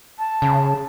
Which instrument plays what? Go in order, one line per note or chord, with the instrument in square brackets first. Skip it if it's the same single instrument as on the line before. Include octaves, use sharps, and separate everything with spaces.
[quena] A5
[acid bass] C#3